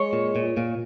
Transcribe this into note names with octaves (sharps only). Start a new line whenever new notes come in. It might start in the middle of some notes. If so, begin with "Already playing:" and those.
Already playing: G#3 C#5
A#2
A#2
A#2